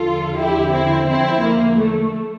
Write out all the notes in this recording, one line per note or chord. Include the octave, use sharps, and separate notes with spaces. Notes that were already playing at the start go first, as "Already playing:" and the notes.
Already playing: E2 D3 F3 F4 A4
E4 G4
C4 E4
C4 E4
A#3
A3